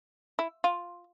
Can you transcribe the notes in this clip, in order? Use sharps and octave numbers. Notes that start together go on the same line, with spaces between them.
E4
F4